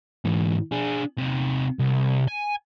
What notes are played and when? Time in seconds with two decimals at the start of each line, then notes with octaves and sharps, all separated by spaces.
0.25 G#2 E3
0.72 D4 G#4
1.18 C3 D#4
1.79 C2
2.28 G#5